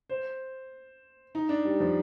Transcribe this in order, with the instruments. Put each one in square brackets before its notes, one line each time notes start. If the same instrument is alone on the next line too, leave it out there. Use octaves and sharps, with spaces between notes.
[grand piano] C5
D#4
D4
G3
F3